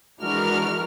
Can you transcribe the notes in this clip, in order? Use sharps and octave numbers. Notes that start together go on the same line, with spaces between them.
E3 G#3 D4 F#4 A#4 F6